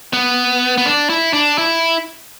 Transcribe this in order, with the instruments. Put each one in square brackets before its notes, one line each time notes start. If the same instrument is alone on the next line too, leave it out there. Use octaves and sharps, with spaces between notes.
[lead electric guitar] B3
B3
D4
E4
D4
E4